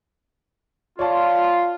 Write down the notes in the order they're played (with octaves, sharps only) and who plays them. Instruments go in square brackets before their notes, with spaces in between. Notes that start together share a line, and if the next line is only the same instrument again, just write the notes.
[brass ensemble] F4 [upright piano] C#5 D5 A5